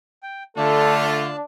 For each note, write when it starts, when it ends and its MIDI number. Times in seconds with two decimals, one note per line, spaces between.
0.23 0.43 79
0.57 1.34 50
0.57 1.34 57
0.57 1.34 65
0.57 0.96 69
0.57 1.36 74
0.57 1.36 81
1.06 1.43 62